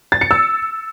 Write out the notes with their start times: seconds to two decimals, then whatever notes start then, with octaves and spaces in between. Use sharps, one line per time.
0.12 A6
0.21 C#7
0.31 E6